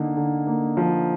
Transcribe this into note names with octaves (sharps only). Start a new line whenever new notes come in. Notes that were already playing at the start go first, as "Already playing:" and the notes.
Already playing: D3 A#3 D#4
D3
A#3
F3